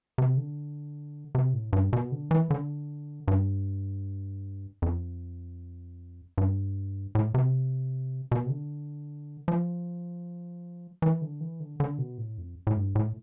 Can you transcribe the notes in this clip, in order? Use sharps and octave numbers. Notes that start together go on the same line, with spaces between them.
C3
D3
C3
A2
G2
B2
D3
E3
D3
G2
F2
G2
A2
C3
B2
C3
D3
F3
E3
D3
E3
D3
D3
B2
A2
F2
A2
G2
A2